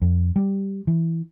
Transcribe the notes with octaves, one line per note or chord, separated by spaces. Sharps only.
F2
G3
E3